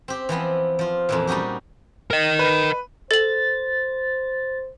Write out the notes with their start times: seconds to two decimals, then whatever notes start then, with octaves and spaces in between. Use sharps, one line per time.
0.08 C4 G4
0.29 E3 F3 B3 C4
0.79 F3 F4
1.09 F2 A#2 E3
1.27 G3 C#4 D#4 F#4 G4
2.11 A#4 D#5
2.39 B4
3.11 A4 C5 A6 F#7